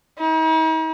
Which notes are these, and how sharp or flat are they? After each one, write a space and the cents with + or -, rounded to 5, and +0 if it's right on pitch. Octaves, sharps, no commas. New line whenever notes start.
D#4 +45